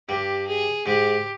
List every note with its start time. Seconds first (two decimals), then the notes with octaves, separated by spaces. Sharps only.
0.09 G2 G3 G4
0.48 G#4
0.86 G#2 G#3 G4